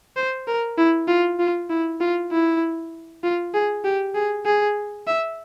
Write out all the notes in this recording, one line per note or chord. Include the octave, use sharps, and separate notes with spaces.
C5
A#4
E4
F4
F4
E4
F4
E4
F4
G#4
G4
G#4
G#4
E5